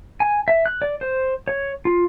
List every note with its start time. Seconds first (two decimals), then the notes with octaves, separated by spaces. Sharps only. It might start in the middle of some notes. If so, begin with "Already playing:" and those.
0.20 G#5
0.48 E5
0.66 F#6
0.82 D5
1.01 C5
1.48 C#5
1.85 F4